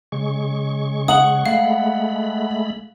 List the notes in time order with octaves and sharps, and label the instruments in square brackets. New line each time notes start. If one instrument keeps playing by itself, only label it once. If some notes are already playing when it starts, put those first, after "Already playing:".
[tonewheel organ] C#3 G#3 C#6
[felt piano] F#5 [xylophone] D#6 F#7
[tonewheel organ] G#3 A3 B5 [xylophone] F5